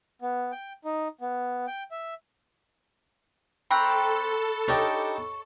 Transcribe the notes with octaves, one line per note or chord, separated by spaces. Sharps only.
B3
G5
D#4
B3
G5
E5
C4 A4 G5 A#5 B5 C#6 F#6
D4 D#4 G4 C#5